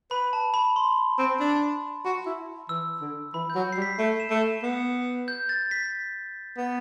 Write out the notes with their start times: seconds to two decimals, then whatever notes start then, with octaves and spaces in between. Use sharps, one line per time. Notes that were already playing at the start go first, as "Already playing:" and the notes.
0.11 B4 B5
0.33 A5
0.54 B5
0.76 C6
1.19 C4
1.40 D4
2.05 F#4
2.26 E4
2.69 E3 E6
3.01 D3
3.34 E3 B5
3.50 G6
3.55 F#3
3.72 G3 C7
3.82 B6
3.99 A3 C7
4.20 E7
4.31 A3
4.41 E7
4.63 B3
5.28 G6
5.49 A6
5.71 B6
6.57 B3